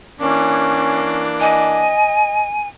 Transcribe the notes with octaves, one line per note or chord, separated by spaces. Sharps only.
E3 A#3 C#4 D4
D#5 G#5